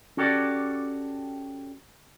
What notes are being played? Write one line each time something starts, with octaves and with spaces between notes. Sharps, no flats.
C#4 F#4 G4 A4 D5